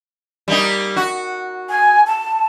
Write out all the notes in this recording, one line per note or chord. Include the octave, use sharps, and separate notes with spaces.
G3 A#3 D#4
F#4
G#5
A5